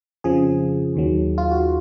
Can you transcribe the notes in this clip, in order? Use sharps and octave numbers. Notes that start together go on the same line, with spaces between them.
F2 C#3 F3 G#4
D#2 D#3 F#3
F4
F#4